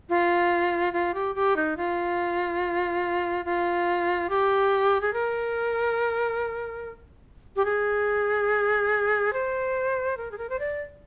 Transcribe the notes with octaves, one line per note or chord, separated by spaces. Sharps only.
F4
F4
G4
G4
D#4
F4
F4
G4
G#4
A#4
G4
G#4
C5
A#4
G#4
A#4
C5
D5